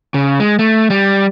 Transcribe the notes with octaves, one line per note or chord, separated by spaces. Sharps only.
C#3
G#3
A3
G3